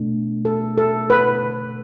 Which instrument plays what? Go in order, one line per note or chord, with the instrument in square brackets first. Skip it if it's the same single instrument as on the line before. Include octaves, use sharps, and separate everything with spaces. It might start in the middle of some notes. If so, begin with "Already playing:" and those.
Already playing: [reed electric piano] B2 A3 D4
[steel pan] A4
A4
B4